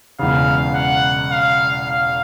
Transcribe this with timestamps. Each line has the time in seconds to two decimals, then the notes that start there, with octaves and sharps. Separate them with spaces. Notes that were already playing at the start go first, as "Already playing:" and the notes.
0.19 E1 E2 C#3 F5
0.75 F#5
1.31 F5
1.87 F5